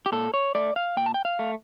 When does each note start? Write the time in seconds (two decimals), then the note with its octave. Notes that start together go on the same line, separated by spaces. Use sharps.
0.06 G4
0.12 A#2 A4
0.34 C#5
0.55 A3 D5
0.76 F5
0.97 A#2 G5
1.06 A5
1.14 G5
1.25 F5
1.39 A3